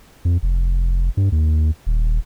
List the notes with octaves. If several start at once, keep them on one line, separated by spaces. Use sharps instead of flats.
F2
F1
G2
D#2
D#1